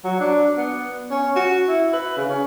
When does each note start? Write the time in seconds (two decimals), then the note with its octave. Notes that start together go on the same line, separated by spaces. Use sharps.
0.04 F#3
0.20 D4
0.57 B3
1.11 C#4
1.36 F#4
1.68 E4
1.93 B4
2.17 C#3
2.29 C#4